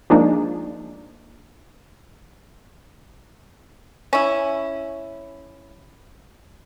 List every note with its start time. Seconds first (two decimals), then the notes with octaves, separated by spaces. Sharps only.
0.10 F3 G#3 A#3 D4 D#4
4.13 C#4 E4